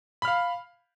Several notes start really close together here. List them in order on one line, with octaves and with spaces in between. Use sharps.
B5 F6 F5